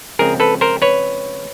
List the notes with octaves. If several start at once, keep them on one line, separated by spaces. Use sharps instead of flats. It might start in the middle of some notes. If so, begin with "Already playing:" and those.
C#3 F3 G#3 C4 G#4 A#4
A4 B4
A#4 C5
B4 C#5